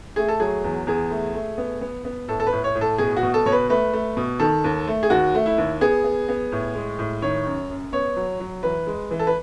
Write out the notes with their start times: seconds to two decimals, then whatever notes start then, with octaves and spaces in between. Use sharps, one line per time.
0.16 A3 G#4
0.28 A4
0.40 F#3 G#4
0.64 E2
0.87 E2 G#4
1.11 A3
1.34 A3
1.58 B3
1.81 B3
2.05 B3
2.28 A2 A4
2.40 A4
2.47 B4
2.53 A2
2.64 C#5
2.75 A2
2.81 A4
2.98 B2 G#4
3.17 F#4
3.23 B2
3.34 A4
3.46 B2 C#5
3.52 B4
3.69 A3 B4
3.93 A3
4.17 B2
4.40 D#3 A4
4.64 D#2
4.87 A3
5.03 G#4
5.10 D#2 F#4
5.35 A3
5.46 E4
5.58 D#2
5.81 B3 G#4
6.04 B3
6.29 B3
6.52 A2
6.75 G#3
6.99 A2
7.22 D#3 C#5
7.45 F#2
7.70 F#2
7.93 B3 C#5
8.16 F#3
8.40 F#3
8.63 E3 B4
8.87 G#3
9.11 E3
9.19 A4
9.27 B4